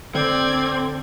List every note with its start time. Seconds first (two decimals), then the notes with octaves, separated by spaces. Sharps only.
0.15 D3 C4 D5 G5 G#6